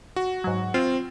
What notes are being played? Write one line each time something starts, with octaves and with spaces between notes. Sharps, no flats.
F#4
G#2 F#3
C4 F4